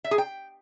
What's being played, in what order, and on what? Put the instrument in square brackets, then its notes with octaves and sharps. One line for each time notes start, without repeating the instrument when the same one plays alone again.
[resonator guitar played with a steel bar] E5
G#4
G5